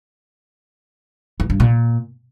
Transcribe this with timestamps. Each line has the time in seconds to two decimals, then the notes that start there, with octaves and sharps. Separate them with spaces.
1.40 E3
1.50 G2
1.60 A#2